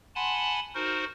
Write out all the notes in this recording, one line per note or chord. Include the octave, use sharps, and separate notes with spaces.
F#5 G#5 A5 B5 C6
D#4 F#4 A#4 C5